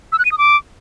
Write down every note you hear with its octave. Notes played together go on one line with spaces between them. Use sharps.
E6
F#6
D#7
D#6
D6